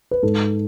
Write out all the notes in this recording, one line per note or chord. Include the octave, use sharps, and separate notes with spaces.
B4
G#2 A4